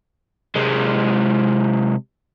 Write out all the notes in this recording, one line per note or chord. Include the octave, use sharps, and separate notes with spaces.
C3 G#3